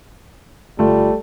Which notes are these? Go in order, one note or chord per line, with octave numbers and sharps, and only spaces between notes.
G1 G3 A3 F4